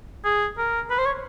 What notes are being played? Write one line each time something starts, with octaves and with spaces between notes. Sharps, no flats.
G#4
A#4
B4
C5
C#5